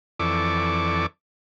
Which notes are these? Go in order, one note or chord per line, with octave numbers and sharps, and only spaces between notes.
F2 E3 A4 D5 C#6 D6